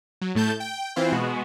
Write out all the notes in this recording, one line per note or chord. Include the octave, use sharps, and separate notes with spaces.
F#3
A2 A3 A5 G6
G5
E3 C4 E4 F4 C5
B2 G#3 B3 F#4